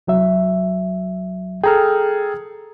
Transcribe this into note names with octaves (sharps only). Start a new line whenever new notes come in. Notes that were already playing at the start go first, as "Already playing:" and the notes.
C2 F#3 E5
G#4 A4 G5 A#5 F6